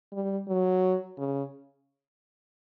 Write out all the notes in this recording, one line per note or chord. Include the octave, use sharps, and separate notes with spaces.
G3
F#3
C#3